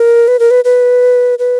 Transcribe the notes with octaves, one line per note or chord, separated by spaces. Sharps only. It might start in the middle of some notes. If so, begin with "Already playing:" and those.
Already playing: A#4
B4
A#4
B4
B4
B4